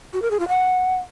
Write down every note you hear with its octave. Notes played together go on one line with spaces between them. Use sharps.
F#4
A#4
G#4
F4
F#5